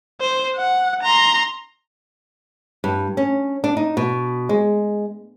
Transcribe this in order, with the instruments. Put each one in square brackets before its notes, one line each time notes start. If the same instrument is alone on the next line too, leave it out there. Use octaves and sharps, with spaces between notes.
[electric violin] C5
F#5
A#5 C6
[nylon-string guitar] G2
C#4
D4
D#4
B2
G#3